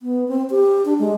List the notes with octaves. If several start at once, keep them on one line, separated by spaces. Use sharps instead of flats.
B3
C4
G4
D4
G#3